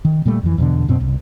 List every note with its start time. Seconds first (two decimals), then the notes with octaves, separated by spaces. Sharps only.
0.05 D#3
0.26 A#2 G3 A3
0.43 F2 E3
0.58 E2 B2 D3
0.88 F#2 B2 C4
1.00 C2